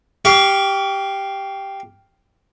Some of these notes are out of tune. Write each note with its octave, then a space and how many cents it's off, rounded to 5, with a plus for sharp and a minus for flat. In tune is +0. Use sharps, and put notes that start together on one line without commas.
G4 +0 F5 +0 C#6 +40